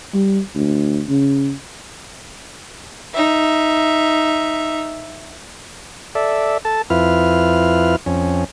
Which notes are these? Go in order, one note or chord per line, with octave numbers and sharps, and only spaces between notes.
G3
D2
C#3
D#4 E5
A4 D5 E5
A4 A5
F2 E4 F4 B4 F6
F2 C#4